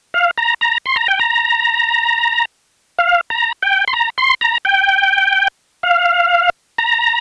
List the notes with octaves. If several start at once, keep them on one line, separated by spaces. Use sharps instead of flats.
F5
A#5
A#5
C6
A#5
G5
A#5
F5
A#5
G5
C6
A#5
C6
A#5
G5
F5
A#5